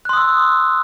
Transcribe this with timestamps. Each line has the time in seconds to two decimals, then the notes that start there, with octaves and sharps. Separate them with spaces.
0.05 F#6
0.09 C6
0.13 D#6
0.17 E6